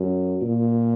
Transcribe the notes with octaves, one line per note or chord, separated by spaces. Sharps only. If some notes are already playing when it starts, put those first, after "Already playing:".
Already playing: F#2
A#2